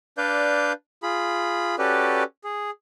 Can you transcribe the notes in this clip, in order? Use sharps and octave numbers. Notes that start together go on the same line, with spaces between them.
D4 B4 D5 F5 G6
F4 G#4 B5
C#4 F#4 G4 A4 B4 D5
G#4